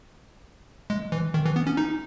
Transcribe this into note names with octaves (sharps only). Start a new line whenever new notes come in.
G#3
E3
D#3
E3
B3
C#4
D#4